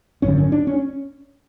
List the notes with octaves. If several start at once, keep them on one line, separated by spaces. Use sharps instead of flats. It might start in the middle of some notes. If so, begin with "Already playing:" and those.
G#1 F#2 D3 C#4
C#4
D4
C#4